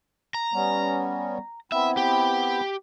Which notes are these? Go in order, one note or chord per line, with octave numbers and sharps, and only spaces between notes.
A#5
G3 B3 C#4
B3 C4 E4 E5
G4